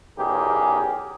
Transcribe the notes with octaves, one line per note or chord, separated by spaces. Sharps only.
B1 E2 C#4 G4 G#4 A#4